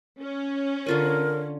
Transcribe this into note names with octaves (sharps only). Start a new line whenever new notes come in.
C#4
D3 F4 A#4 G#5